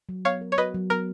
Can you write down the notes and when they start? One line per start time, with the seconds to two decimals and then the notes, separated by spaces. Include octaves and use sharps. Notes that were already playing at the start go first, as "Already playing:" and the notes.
0.09 F#3
0.25 B3 C#5 F5
0.41 A#4
0.52 C#5
0.58 F#4 B4 D#5
0.74 F#3
0.90 B3 A#4